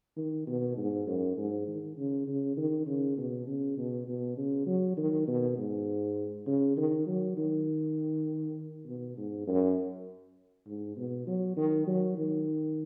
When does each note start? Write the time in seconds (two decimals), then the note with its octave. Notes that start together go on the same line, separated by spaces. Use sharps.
0.17 D#3
0.47 B2
0.77 G#2
1.07 F#2
1.37 G#2
1.67 D#3
1.97 C#3
2.27 C#3
2.57 D#3
2.87 C#3
3.17 B2
3.47 C#3
3.77 B2
4.07 B2
4.37 C#3
4.66 F#3
4.97 D#3
5.27 B2
5.57 G#2
6.47 C#3
6.77 D#3
7.07 F#3
7.37 D#3
8.86 B2
9.17 G#2
9.47 F#2
10.67 G#2
10.97 B2
11.27 F#3
11.57 D#3
11.87 F#3
12.17 D#3